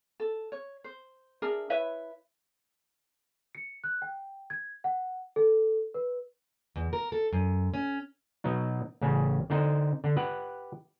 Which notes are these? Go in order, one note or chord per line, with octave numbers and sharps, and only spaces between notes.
A4
C#5
C5
D4 G#4 A#4 E5
E4 B4 C#5 E5
C#7
F#6
G5
G#6
F#5
A4
B4
E2
A#4
A4
F#2
C#4
B2 F#3 D#4
A1 C#3 C#4
D3 D#4 C5
D3
G4 B4 F#5